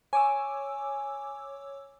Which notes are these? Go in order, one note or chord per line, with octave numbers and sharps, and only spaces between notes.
C#5 G#5 D6 E6